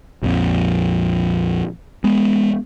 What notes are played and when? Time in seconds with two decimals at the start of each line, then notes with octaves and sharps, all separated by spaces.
0.23 A#1 F2
2.04 G#3 B3